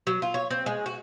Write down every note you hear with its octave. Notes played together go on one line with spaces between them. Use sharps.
F#3
F4
C#5
C4
G#3
F#4